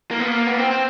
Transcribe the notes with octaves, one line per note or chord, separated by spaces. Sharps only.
A#3
B3
A#3
B3
C4
C4